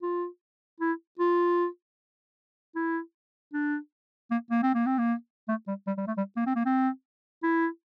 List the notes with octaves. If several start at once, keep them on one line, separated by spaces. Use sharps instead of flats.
F4
E4
F4
E4
D4
A#3
A#3
C4
A#3
C4
A#3
A3
G3
G3
G3
A3
G3
A#3
C4
A#3
C4
E4